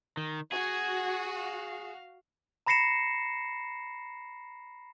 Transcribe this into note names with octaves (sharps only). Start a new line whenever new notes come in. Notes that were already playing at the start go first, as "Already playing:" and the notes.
D#3
F#4 G#4 G#6
F5
A#5 B5 A#6 C7 C#7 E7